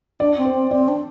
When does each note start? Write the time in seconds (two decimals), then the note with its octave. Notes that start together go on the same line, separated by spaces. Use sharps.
0.20 D4 D5
0.37 C4
0.45 C5
0.54 C4
0.71 C4 D5
0.88 D4